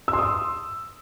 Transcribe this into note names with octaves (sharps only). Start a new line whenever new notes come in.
E6
C6
D#6